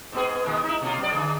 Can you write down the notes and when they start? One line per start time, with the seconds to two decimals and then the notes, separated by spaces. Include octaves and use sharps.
0.12 G#2 B3 G#4
0.45 A#2 D#3 G#3
0.63 D#4 E4
0.82 B2 A#3 F4
0.99 F#2 D5
1.12 D3 F#3 G#4